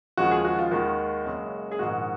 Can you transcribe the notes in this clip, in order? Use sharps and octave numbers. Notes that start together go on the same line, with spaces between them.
D#2 C#3 F3 G#3 F#4
G#4
F#4
F4
D#2 D#3 G#3 F#4
F#1 F#2 C#3 G#3
G#4
A#1 G#2 D#3 G#3 F#4